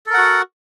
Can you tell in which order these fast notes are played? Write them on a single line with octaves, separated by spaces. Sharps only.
A4 A#4 F#5 F#4